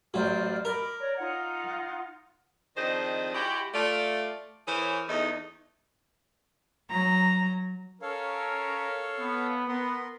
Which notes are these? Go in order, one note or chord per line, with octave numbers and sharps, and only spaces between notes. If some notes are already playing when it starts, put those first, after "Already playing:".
A1 F#3 C5 D5 F6
A#4 D#5 B5 D6
C#5 D5 A#5
D#4 F4 F#5
F2 D#3 D4 D#4 G#4 C5
G#3 E4 F#4 G4
A3 F4 D5
E3 G#4 A#4 C5 C#5
E2 A3 D#4
F#3 A#5
C#4 A4 A#4 C#5 F5
B3
B3 A#4 C6